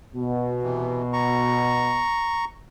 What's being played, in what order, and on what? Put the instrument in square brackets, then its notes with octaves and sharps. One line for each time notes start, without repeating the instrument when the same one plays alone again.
[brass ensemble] B2
[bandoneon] C3 E3
A#5 C#6